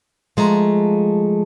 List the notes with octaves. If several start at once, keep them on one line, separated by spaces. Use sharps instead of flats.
F3 G#3 A3 A#5